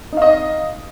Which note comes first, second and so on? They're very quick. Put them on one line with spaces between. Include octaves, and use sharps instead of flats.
D#4 F5 D#5